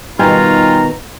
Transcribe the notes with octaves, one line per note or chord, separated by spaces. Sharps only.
B2 D#3 G3 D#4 F4 G5 G#5 A#5